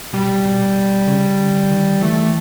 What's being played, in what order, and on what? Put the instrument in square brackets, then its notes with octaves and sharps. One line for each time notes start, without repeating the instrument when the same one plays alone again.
[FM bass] B2 [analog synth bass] G3
[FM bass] B2
C#3
D3
D#3
[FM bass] E3 [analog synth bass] A3